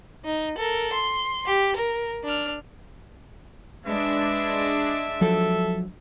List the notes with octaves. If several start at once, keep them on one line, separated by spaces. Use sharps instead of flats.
D#4
A4 A#4
C6
G4
A#4
D4 F6
G#3 D4 B4 E5
F3 F#3 A4